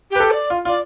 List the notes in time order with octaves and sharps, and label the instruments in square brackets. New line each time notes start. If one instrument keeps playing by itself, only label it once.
[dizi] G4
[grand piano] B4
A4
[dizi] D5
[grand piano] F4
[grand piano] F4 [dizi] D5